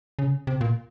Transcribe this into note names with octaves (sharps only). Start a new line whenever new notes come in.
C#3
C3
A#2